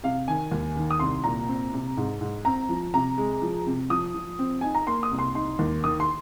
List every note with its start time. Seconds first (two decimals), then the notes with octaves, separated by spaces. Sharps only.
0.03 C3 F5
0.28 D#3 G#5
0.52 D#2
0.76 D#3
0.91 D#6
1.00 C2 C6
1.24 A#2 A#5
1.48 C4
1.73 C3
1.97 G#2
2.21 G#2
2.45 C4 A#5
2.69 F3
2.94 C3 A#5
3.18 G#3
3.42 F3
3.66 C3
3.90 F3 D#6
4.14 F3
4.39 C4
4.61 D#4 G#5
4.75 A#5
4.87 A#3 C6
5.03 D#6
5.11 C2
5.19 C6
5.35 D#4 C6
5.59 D#2
5.84 D#3 D#6
6.00 C6